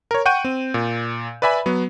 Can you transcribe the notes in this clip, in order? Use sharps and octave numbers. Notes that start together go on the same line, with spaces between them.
A#4 C#5
F#5 G5 C#6 G6 D#7
C4
A#2
B4 D5 E5 G#5 B5
F#3 B3